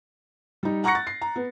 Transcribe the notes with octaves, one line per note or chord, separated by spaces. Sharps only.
G3 D#4
F#5 A#5 C#6 F#6 A#6 C#7
A6
C7
A#5
B3